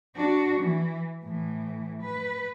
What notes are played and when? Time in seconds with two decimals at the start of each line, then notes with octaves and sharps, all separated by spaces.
0.16 D4 F#4
0.60 E3
1.23 A2 E3
2.02 B4